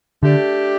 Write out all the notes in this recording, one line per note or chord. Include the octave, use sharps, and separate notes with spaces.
D3 A3 D4 G4